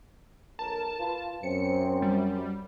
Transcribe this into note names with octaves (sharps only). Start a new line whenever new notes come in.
B1 A#4 A5
F4 B4
F#2 C4 C#7
G3